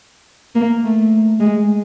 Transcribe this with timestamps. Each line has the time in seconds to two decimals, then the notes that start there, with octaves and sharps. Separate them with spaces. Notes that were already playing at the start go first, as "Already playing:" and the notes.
0.55 A#3
0.83 A3
1.40 G#3